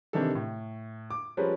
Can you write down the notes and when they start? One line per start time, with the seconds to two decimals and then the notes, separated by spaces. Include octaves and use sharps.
0.13 C3 D#3 E3 D4 A4
0.35 A2
1.10 D6
1.37 F3 G3 G#3 C#4 A#4 B4